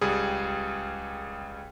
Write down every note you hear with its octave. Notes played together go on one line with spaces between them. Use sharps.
C#2 G3 G#4